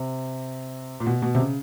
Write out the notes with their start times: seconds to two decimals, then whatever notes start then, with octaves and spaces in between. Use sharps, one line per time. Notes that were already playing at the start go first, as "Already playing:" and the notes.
Already playing: C3
1.00 A#2
1.06 B2
1.22 B2
1.35 C3
1.40 C#3